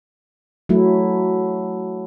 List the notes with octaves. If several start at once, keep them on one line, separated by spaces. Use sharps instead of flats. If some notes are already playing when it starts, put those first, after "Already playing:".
F#3 A3 E4